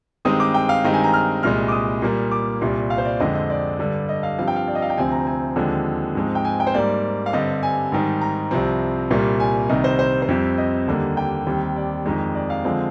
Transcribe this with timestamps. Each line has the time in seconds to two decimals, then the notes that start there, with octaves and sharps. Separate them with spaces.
0.25 G2 D#3 G#3 C4 D#6
0.40 D6
0.54 G5
0.69 F5
0.84 G2 D#3 G#3 C4 D#5
0.94 G#5
1.04 A#5
1.14 F6
1.43 C2 A#2 G#3 F6
1.68 D6
1.72 D#6
2.02 A#2 G3 A#3
2.31 D6
2.61 C2 A#2 G3
2.90 F5
2.98 C5
3.05 D5
3.20 F2 D3 G#3 C4 D#5
3.35 D#5
3.50 D5
3.79 G2 D3 G3
4.09 D#5
4.23 F5
4.38 G2 F3 C4 F5
4.47 G5
4.56 F5
4.68 D5
4.75 D#5
4.82 F5
4.90 G5
4.97 D2 C3 F3 C4 G#5
5.12 A#5
5.27 G#5
5.56 D#2 D3 F3 G#3 C4
6.15 G#2 F3 G#3 C4
6.35 G5
6.45 G#5
6.60 G5
6.67 C5
6.74 G#2 G3 A#3 D5
7.26 F5
7.33 G2 D3 G3 C4 D#5
7.63 G#5
7.92 G#2 D#3 G3
8.21 A#5
8.51 C2 C3 F3 C4
9.10 C2 A#2 G3 A#3
9.40 G#5
9.69 C2 C3 D#3 D#5
9.84 C5
9.99 C5
10.22 C5
10.29 F2 C3 G3
10.58 D#5
10.87 D#2 D3 G3 A#3
11.17 G5
11.47 D#2 D#3 G3 C4
11.76 D5
12.06 F2 D#3 G#3
12.35 D5
12.50 F5
12.64 D3 F3 G#3 C4